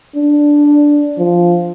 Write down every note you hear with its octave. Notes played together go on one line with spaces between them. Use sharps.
D4
F3